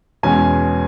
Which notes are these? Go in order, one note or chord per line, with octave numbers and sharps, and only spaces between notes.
E2 B2 G#3 C#4 G#5